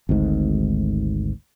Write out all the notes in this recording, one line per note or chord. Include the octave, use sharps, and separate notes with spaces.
G#1 D2 G#2